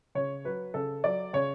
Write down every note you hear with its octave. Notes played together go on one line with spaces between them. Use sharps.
C#3 C#5
F#3 B4
C#3 A4
F#3 D5
C#3 C#5